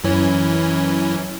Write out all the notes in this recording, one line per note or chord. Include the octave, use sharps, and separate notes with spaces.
F#2 E3 C#4